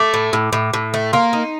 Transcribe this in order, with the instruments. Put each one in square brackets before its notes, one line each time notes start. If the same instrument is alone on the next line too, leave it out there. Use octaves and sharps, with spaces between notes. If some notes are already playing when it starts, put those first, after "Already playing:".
Already playing: [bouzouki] A3 [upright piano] D6
[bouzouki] A2
A2
A2
A2
A3
[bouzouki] A#3 [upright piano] C6
[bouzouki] D#4